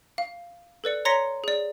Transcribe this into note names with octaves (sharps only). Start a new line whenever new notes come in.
F5
A4 B4 D5 C#7
C#5 A#5 C6 A#6 B6 C#7
G#4 D5